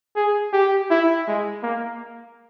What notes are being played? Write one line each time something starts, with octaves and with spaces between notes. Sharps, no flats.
G#4
G4
E4
G#3
A#3